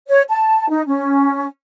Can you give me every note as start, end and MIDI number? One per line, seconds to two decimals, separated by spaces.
0.08 0.22 73
0.28 0.69 81
0.69 0.82 63
0.87 1.46 61